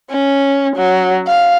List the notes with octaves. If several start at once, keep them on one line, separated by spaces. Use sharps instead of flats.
C#4
F#3
F5